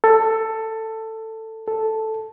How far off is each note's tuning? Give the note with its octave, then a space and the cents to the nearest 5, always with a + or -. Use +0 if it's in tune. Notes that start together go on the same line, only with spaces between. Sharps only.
A4 +15
A4 +0